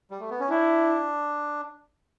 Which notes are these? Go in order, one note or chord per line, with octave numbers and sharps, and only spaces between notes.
G3
A3
B3
C#4
D4 E4